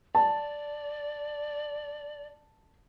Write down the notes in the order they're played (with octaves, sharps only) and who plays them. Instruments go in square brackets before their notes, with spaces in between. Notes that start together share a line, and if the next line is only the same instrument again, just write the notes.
[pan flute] D5 [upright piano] A5